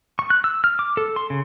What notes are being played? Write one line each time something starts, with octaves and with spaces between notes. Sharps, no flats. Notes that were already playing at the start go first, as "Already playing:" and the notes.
C#6
F#6
E6
F6
D6
A4
C6
C#3